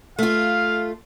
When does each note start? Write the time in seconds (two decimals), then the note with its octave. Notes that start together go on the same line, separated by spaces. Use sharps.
0.19 A3 F4 F5